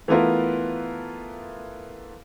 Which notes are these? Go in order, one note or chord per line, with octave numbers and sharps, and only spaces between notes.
E3 A3 B3 F4 A#4